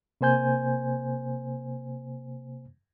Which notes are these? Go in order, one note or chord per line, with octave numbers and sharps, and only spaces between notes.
C3 A#3 C5 G#5 G6